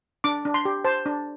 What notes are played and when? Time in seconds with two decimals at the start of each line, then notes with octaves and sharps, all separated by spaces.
0.24 D4 D6
0.45 D4
0.54 C6
0.65 G4
0.85 C5 A5
1.06 D4